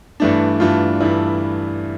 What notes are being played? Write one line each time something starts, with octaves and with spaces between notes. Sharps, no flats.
G2 E3 A3 D4
G2 E3 A3 D4 F4
G2 E3 A3 D4 E4